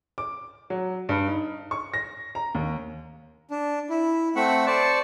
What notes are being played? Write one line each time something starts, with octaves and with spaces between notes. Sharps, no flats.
D6
F#3
G2
D#4
C#6
A#6
A#5
D#2
D4
E4
A3 C4 E5 F#5 C#6
C5 D5 A5 C#6